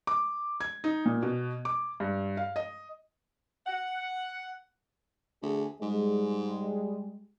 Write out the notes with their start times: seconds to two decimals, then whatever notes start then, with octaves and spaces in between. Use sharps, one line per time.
0.07 D6
0.61 G#6
0.84 D#4
1.05 A#2
1.22 B2
1.65 D6
2.00 G2
2.37 F5
2.56 D#5
3.67 F#5
5.42 D2 G#4
5.81 G#2 G3 G#3